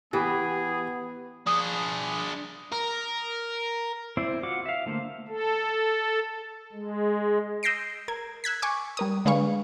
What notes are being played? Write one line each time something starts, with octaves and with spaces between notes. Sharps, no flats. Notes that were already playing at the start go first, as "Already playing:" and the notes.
E3 B3 G4 G#4
D4 G#4 D#6
A#4
C4 E4 C5 D5
F4 F#4 F#5 D6
E5 F5
D3 A3 A#3 C5
A4
G#3
D#6 E6 G6 A#6 C7 D7
A#4 G#6
E6 F#6 G#6 B6
G#5 C#6 D6
G3 A#4 D#6
D3 G#3 G#4 B4 F5 C#6